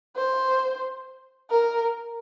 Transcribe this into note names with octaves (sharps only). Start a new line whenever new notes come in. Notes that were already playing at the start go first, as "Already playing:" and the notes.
C5
A#4